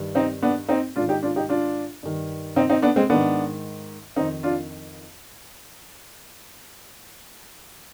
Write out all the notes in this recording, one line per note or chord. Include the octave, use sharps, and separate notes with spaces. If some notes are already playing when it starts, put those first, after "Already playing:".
Already playing: G2 D#3
C4 D#4
B3 D4
C4 D#4
G#2 D#3 D4 F4
D#4 G4
D4 F4
D#4 G4
D4 F4
G2 D#3
C4 D#4
C4 D#4
B3 D4
G#3 C4
G#2 D#3 B3 D4
F2 D#3 C4 D#4
D4 F4